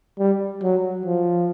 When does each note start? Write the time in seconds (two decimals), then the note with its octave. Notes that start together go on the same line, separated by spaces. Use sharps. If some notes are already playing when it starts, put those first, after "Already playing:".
0.19 G3
0.63 F#3
1.06 F3